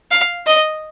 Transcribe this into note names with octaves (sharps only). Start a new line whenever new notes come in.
F5
D#5